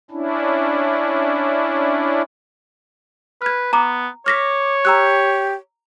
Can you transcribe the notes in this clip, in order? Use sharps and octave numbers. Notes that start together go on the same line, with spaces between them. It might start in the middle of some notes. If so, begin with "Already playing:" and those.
C#4 D4 E4
B4 F6 G#6
B3 A#5 D6
C#5 D6 F6 A#6 B6
G4 A#5 E6 F#6